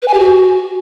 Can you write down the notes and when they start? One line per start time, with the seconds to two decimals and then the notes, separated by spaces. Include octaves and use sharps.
0.02 B4
0.08 G#5
0.13 G4
0.19 F#4